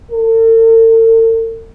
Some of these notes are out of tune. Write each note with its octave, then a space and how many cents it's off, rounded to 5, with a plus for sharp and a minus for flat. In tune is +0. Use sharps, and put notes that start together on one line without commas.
A4 +45